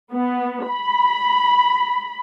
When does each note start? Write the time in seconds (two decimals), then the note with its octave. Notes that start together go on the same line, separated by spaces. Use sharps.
0.11 B3
0.69 B5